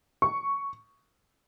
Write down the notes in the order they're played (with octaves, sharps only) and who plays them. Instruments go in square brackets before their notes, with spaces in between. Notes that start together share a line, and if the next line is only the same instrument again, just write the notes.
[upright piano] C#6